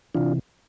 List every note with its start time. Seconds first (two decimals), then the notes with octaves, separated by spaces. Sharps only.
0.15 C3 E3 D4 F4